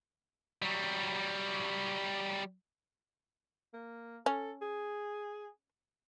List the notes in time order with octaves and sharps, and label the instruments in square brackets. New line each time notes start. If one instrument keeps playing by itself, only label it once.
[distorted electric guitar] F#3 G3
[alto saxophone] A#3
[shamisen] C#4 [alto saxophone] A4
[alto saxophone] G#4